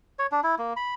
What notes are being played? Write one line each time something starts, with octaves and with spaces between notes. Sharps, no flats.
C#5
D4
E4
A#3
B5